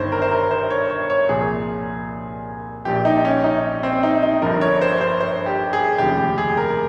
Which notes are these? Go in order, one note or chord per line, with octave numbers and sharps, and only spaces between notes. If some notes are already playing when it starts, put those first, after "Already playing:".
Already playing: G1 G2 D#3 C5 C#5
A#4
C5
A#4
C5
C#5
C#5
C#5
C2 A#2 F3 G#4
A#1 A#2 F3 G4
D#4
C#4
D#4
C4
D#4
D#4
G1 G2 F3 A#4
C#5
C5
C5
C5
G4
G#4
F1 D#2 C#3 F3 G4
G4
G#4
A#4